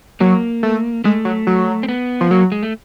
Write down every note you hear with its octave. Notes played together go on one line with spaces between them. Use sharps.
F#3 A#3
A3
G#3 A3
F#3
F#3
C4
B3
F3
F#3 A#3
G#3
A3